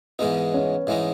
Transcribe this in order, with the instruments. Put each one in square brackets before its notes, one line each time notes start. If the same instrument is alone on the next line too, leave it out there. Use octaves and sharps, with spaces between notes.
[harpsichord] G#2 E3 G#3 D#4 [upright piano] B3
[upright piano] C#4
[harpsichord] G#2 E3 G#3 D#4 [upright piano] E4